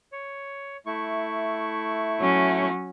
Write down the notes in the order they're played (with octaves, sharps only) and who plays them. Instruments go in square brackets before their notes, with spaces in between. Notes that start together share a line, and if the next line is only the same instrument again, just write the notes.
[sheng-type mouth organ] C#5
A3 E4 C#6
[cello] F#3 C#4